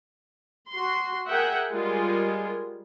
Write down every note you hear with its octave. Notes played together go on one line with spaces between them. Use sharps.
F#4 C6
G#4 A#4 E5 F#5 G5
G3 G#3 F4 G#4 A#4